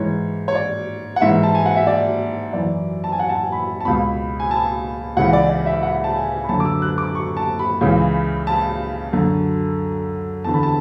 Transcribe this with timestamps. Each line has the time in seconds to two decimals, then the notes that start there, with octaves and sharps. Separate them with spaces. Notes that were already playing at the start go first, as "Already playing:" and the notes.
Already playing: G#2 E3 C#5
0.48 C#5
0.55 D5
1.16 F#5
1.21 G#2 E3 E5
1.43 A5
1.55 G#5
1.66 F#5
1.77 E5
1.87 D5
2.53 F#2 E3 D5
3.04 A5
3.12 G#5
3.19 F#5
3.29 A5
3.36 G#5
3.52 B5
3.80 A5
3.85 C#2 B2 B5
4.40 G#5
4.51 A5
5.17 C#2 C#3 E3 F#5
5.33 D5
5.50 D5
5.66 E5
5.83 F#5
6.04 A5
6.16 G#5
6.44 B5
6.49 F#2 D3 A5
6.60 D6
6.65 E6
6.82 F#6
6.98 D6
7.15 C#6
7.37 A5
7.59 B5
7.81 C#2 C#3 E3
8.47 A5
9.13 F#2 D3
10.44 E2 D3 A5
10.54 B5
10.63 A5